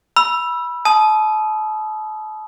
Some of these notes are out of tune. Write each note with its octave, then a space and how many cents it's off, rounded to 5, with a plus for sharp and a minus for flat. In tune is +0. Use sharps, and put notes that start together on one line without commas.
B5 -20 E6 +15
A5 -35 D#6 +0